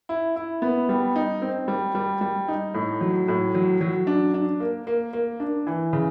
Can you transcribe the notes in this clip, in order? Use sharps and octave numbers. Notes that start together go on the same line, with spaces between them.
E4
E4
B3
G3
D#4
C4
G3
G3
G3
D#4
A2
F#3
A2
F#3
F#3
D4
D4
A#3
A#3
A#3
D4
E3
C#3